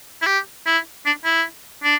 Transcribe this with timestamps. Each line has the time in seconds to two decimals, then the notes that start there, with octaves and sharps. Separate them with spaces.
0.22 E4
0.26 G4
0.66 E4
1.06 D4
1.25 E4
1.84 D4